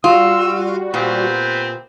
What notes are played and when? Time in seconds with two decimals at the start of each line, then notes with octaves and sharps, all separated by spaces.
0.04 G3 F4 F#4 E6
0.94 A#2 B3 C4 G4